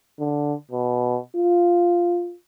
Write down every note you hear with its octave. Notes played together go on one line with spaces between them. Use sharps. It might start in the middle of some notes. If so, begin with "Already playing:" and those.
D3
B2
F4